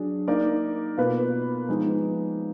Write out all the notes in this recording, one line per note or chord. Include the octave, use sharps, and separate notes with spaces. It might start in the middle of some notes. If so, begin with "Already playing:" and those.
Already playing: F#3 D4 G#4
A#3 D#4 A#4 D5
B2 A#3 F4 B4
F3 G#3 B3 D#4